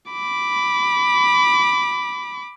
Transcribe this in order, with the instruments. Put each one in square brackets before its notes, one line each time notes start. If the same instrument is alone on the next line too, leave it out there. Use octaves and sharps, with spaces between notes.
[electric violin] B5 D6